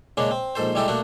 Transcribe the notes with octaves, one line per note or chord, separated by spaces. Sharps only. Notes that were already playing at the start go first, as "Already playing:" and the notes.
C#3 G#3 A#3 C#4 D4
C4
A#1 G#2 A4 C5
G3 G#3 E4 G4 A4
A3 A#3 D4 F#4